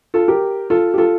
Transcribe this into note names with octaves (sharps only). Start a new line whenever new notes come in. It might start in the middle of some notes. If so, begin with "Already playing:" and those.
F4 A4
G4 A#4
F4 A4
G4
F4 A4